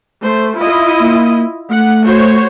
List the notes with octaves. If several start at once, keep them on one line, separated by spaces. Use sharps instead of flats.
A3 C5
E4 F4 D#5
A#3
A3 F#5
F#4 C5 C#5